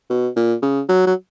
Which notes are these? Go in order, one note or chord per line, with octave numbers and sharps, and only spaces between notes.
B2
A#2
C#3
F#3
F#3